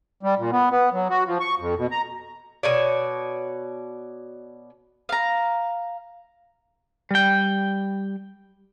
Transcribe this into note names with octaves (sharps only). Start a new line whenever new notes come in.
G3
A#2
B3
B3
F#3
F#4
F3
C#6
F2
B2
A#5
B2 C#5 D5
F5 A#5
G3 G5